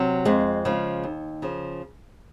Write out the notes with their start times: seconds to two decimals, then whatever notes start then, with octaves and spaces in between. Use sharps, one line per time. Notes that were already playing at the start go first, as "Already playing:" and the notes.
Already playing: C3 F#3
0.25 F2 G#3 C4
0.65 C#3 F3 G#3
1.04 D#2
1.42 C#3 F3